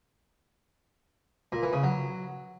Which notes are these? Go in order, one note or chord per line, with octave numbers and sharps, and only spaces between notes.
A#2
E3
C#3
F#3